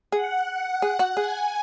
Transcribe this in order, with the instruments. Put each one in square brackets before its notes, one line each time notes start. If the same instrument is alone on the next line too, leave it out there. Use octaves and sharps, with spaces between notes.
[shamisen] G#4 [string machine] F#5
[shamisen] G#4
F#4
[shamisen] G#4 [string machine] G#5